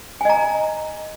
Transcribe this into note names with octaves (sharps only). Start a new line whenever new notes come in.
D#5 G#5 A#5